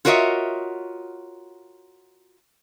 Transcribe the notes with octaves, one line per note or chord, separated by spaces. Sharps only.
F4 F#4 A#4 C#5 D#5 E5